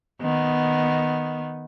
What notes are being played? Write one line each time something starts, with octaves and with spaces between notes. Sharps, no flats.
D#3 B3